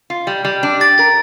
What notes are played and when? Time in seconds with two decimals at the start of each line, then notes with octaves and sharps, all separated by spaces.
0.10 F4
0.27 G3
0.45 G3
0.63 D4
0.80 G4 A6
0.98 A#4 A6